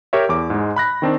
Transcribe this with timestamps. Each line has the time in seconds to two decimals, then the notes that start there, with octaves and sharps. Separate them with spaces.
0.13 G4 A#4 C#5 E5
0.29 E2 D6
0.50 G#2 G#3
0.76 B5 F#6 A#6
1.02 D#3 C4 D4